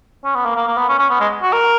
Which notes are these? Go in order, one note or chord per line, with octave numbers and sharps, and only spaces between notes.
C#4
B3
A#3
A#3
A#3
B3
C#4
C#4
B3
G#3
F#4
A#4